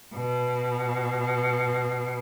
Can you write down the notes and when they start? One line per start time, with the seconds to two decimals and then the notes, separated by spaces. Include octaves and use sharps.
0.14 B2